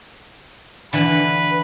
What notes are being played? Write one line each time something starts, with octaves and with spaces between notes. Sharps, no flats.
D3 E3 B4